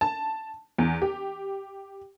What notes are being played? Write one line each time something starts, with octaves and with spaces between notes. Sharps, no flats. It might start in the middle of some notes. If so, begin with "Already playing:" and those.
A5
E2
G4